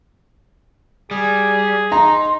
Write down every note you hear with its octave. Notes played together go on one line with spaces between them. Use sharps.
G3 G#4
D#4 A#5 C6